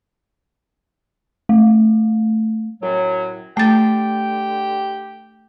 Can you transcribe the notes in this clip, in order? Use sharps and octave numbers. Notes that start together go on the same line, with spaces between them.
A3
F#2 A2 F#3
D3 A3 G4 G5 A6